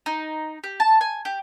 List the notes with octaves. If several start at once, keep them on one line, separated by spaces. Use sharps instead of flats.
D#4
G4
A5
G#5
G4